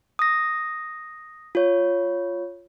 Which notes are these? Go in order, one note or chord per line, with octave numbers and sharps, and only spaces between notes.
D#6 A#6
F4 C#5